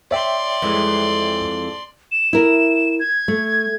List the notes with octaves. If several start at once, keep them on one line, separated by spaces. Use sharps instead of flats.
C#5 D5 E5 G5 C6
F2 E3 G#3
E7
E4 A#4
G#6
A3